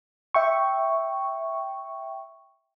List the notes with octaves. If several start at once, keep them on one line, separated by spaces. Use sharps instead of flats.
E5 G5 C#6